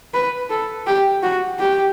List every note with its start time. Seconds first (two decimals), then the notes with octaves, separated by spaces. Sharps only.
0.14 B4
0.50 A4
0.87 G4
1.23 F#4
1.59 G4